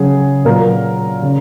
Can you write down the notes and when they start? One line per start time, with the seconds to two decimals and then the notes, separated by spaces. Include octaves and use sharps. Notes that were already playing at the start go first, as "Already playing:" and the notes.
Already playing: C#3 F#3 G#4
0.45 A#2 F#3 A#4
1.22 C#3